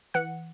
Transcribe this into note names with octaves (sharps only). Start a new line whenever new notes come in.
E3 F#5 F#6